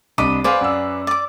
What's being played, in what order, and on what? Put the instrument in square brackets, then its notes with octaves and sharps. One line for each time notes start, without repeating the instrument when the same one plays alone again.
[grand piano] C2 D4 D6 [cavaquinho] D#5 B5
[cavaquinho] G#4 B4 D5 [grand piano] C5 F5
[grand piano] F#2 F#5 E6
[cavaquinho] D5 D6